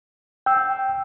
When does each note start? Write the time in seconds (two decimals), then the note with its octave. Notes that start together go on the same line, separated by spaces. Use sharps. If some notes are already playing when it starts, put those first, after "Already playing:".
0.46 G5 E6